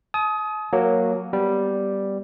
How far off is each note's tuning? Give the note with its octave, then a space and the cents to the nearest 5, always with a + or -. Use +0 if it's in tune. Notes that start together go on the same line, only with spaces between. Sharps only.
A5 -45 D#6 +20
F#3 +0 A#3 +0 C#5 -10
G3 +0 B3 +0